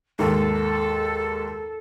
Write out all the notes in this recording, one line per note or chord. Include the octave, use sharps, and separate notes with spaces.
D#2 G#2 A4